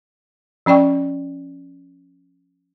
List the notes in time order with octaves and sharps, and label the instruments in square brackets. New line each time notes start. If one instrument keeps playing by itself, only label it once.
[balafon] F3 C#4 D5 G5 C#6